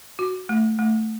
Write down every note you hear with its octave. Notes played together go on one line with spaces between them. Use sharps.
F#4
A3
A3